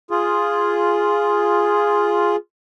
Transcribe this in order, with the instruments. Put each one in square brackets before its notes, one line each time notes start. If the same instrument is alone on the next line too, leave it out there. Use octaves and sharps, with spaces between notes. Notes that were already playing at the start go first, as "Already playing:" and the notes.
[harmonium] F4 G#4